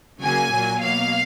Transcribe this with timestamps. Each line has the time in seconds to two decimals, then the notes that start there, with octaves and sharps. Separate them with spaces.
0.21 C#3 F#3 A#3 G#5
0.51 A#2 F#3 A#3
0.80 B2 F#3 A#3 F5